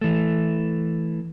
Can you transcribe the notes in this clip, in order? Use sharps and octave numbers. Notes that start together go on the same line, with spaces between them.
E3 A3